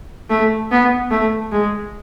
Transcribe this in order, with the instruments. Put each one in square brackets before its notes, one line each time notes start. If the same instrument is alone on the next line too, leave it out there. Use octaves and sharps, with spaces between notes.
[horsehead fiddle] A3
B3
A3
G#3